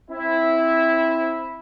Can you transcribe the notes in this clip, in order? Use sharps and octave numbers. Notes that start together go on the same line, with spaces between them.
C4 E4